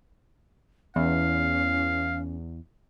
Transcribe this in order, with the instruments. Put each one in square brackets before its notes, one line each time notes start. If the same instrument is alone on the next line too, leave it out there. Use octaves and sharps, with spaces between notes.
[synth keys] E2 [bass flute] C#4 [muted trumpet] F5